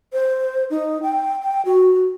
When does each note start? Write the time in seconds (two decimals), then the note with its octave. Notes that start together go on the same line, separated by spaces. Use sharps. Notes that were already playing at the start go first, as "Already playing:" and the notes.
0.13 C5
0.70 D#4
1.03 G5
1.43 G5
1.65 F#4